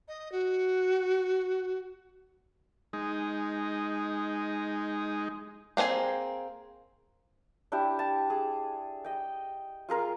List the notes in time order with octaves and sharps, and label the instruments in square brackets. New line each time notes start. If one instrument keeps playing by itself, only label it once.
[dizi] D#5
F#4
[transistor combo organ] G#3 D#4
[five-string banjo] A#3 C4 D4 G#4 G#5
[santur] D4 E4 G4
A5
G#4
D#5 G5
F4 G#4 A#4 C6